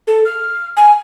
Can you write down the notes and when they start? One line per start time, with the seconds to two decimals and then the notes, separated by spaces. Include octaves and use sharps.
0.07 A4
0.25 F6
0.77 G#5